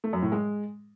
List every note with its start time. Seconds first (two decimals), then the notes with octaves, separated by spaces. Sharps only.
0.04 A3
0.13 F#2
0.22 A2
0.32 G#3